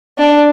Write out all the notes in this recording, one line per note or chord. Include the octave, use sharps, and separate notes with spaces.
D4